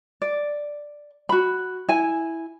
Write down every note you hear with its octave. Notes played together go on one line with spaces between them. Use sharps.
D5
F#4 B5
E4 G#5